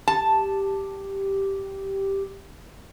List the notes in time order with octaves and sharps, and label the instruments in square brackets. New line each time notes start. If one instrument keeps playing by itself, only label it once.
[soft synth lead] G4 [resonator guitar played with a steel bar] A5